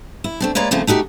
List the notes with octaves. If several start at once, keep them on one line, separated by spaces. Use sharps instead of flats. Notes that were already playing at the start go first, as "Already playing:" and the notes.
E4
A3 C4 D4
G#3 A#3 B4 C#5 D5
D#2 C#3 F3 A3 A#3 C4
A3 D#4 F#4 G4